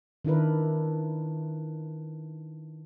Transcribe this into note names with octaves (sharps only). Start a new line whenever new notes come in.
D#3 D4 E4 A#4 B4